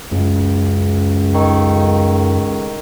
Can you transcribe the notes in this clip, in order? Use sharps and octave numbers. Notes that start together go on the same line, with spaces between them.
C#2 F#2
D#3 A4 C#5